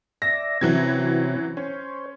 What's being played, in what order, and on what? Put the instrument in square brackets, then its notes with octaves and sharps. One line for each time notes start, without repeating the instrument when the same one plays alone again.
[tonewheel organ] D5 E5 [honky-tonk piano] A#6
[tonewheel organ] C3 C4 C#4 [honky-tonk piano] E3 F#3 G#6
[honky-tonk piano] C#4 [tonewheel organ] C5 C#5